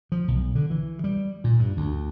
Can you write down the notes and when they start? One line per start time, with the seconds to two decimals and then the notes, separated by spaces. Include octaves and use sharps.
0.12 F3
0.28 B1
0.55 D3
0.70 E3
1.04 G3
1.44 A#2
1.59 G2
1.77 D2